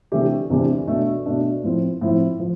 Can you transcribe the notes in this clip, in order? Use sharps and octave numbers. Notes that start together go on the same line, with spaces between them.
C3 E3 A3 D4 G4
C3 E3 A3 D4 G4
B2 A3 D4
B2 A3 D4
A2 F3 C4
A2 F3 C4
F3